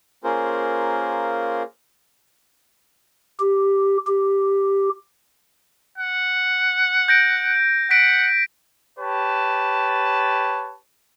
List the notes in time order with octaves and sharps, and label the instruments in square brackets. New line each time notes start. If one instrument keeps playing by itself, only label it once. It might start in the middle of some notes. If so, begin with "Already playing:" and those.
[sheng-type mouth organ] A#3 C#4 F4 G#4 A#4 C5
[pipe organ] G4
G4
[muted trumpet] F#5
[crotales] G6 A#6 D7
[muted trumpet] F#5 [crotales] B6 D7
[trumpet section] G4 B4 C#5 A5